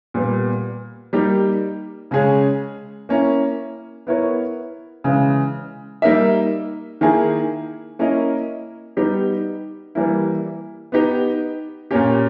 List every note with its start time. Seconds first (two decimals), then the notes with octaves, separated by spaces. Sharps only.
0.14 A#2 G3 B3
1.13 G3 A#3 D#4 G4
2.11 C#3 G#3 C#4 G#4
3.09 A#3 C#4 E4
4.07 B3 E4 A#4 C#5
5.04 C#3 E3 G#3
6.02 G3 A#3 D#4 A#4 E5
7.01 D#3 A#3 E4 G#4
7.99 A#3 C#4 E4 A#4 D#5
8.96 G3 B3 D#4 G4
9.95 E3 G3 A#3 E4
10.92 B3 D#4 G4
11.91 A#2 A#3 C#4 G4